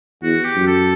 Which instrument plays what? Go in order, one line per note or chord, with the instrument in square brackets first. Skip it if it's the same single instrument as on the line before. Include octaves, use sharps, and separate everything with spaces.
[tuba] E2 [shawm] F#4
[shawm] G4
[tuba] F#2
[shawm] A4